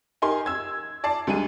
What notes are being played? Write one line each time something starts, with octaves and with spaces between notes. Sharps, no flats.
D#4 G4 A#4 G#5 C6
E6 G#6
D5 A5 D6 C7
D2 G3 G#3 D4 D#7